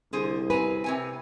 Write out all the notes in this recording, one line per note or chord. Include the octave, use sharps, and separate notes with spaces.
C2 D3 G#4 C5
C4 B4 G#5 A#5
C3 C#5 G#5